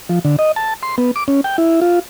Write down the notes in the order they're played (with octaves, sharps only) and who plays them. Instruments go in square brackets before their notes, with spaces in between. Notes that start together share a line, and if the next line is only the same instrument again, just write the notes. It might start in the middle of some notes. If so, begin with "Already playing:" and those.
[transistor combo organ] F3
D3
D#5
A5
C6
B3
D6
C#4
G5
E4
F4